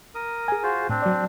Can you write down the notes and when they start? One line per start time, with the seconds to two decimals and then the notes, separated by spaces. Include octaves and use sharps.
0.15 A#4 D#6
0.48 G#4 G#5
0.63 F4 F#4 C5
0.89 A2 C4 D4
1.02 F#3 D5